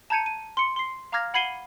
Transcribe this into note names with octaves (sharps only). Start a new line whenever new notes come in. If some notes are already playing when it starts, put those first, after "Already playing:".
A5 A#5 G6 G#6 C#7 D#7
D#7
C6 C#7
C6 C7
F5 A#5 D6 F6 G#6 A#6
F#5 B5 G#6 C7 D#7 G7